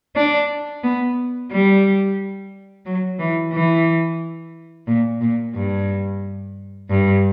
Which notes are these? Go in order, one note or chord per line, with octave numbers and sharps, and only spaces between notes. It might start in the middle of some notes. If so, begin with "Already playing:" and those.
D4
B3
G3
F#3
E3
E3
A#2
A#2
G2
G2